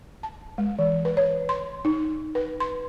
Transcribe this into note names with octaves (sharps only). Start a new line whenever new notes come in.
A5
G#3
E3
B4
C#5
C6
D#4
B4
C6